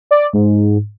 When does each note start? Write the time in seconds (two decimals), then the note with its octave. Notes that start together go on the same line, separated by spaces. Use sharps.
0.11 D5
0.33 G#2